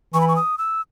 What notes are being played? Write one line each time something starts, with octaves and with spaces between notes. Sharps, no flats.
E3 C#6
B5
C#6
D#6
E6